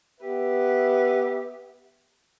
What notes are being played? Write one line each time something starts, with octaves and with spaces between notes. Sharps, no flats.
B3 G4 B4 E5